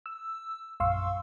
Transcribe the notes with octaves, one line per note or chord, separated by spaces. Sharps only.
E6
A#1 F#2 F5 C6 C#6 E6